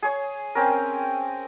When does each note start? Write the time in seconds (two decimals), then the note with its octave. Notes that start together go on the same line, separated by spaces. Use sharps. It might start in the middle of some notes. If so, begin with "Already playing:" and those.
0.02 G#4 C#5
0.55 C4 C#4 A#4